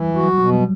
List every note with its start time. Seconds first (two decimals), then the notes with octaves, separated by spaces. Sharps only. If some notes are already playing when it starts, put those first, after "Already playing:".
Already playing: E3 G3
0.09 F#3
0.15 F#4
0.23 F#3
0.38 B2 F#3
0.53 G3